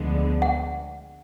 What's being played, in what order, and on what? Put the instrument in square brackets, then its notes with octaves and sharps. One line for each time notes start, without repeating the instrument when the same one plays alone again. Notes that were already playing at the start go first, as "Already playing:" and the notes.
Already playing: [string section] D2 D3 F3 G#3 B3
[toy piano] F#5